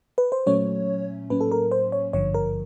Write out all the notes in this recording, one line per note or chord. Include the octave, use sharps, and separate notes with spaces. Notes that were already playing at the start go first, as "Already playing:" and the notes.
B4
C5
A#2 F#3 A3 C#4 C#5
A2 F#3 A#3 C#4 B4
A4
A#4
C5
C#5
G#1 G2 D3 F3 C#5
A#4